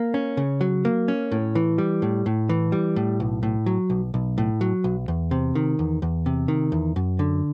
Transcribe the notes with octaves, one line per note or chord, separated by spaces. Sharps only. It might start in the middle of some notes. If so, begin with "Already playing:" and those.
Already playing: A#3
C#4
C#3
F#3
A#3
C#4
A2
E3
G3
A2
A2
E3
G3
A2
B1
A2
F#3
B1
B1
A2
F#3
B1
E2
C3
D#3
E2
E2
C3
D#3
E2
F#2
D3